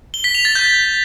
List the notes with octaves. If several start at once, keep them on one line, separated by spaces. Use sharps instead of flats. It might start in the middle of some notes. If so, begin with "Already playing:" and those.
G7
B6
F7
A6
G6